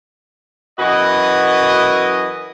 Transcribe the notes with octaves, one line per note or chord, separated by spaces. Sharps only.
F#2 E3 F#4 B4 D#5